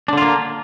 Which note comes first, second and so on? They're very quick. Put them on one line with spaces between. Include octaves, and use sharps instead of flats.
D4 D3 F4 A#3